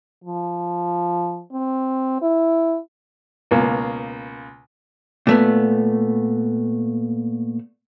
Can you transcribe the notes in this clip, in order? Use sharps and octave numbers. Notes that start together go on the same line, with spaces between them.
F3
C4
E4
C#2 B2 A#3
A#2 A3 B3